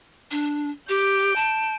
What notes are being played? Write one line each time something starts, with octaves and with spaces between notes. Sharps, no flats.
D4
G4 G6 D7
A5